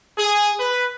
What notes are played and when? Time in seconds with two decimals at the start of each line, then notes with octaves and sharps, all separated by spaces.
0.18 G#4
0.59 B4